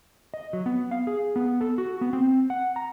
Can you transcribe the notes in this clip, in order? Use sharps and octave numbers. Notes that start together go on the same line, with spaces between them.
D#5
F#3
B3
F5
G#4
B3
A4
F#4
B3
C4
F#5
A#5